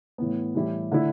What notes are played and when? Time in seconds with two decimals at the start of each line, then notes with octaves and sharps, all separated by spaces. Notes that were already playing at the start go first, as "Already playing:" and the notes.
0.18 A2 E3 B3
0.55 A2 E3 G3 E4 G4
0.92 D3 A3 E4